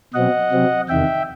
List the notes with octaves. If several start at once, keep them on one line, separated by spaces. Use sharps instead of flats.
B2 F#3 C4 D#5 F#5
C3 F#3 C4
E2 C3 D#3 E5 G5